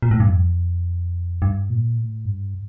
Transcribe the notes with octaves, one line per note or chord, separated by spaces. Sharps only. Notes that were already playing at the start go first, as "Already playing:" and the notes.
A#2
A2
G2
F2
G2
A#2
A2
G2